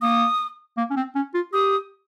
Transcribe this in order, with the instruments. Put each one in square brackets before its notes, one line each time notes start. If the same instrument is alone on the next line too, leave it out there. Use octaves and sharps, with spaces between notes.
[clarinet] A#3 [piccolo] D#6
[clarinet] A#3
C#4
C4
C#4
F4
[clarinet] G4 [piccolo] D#6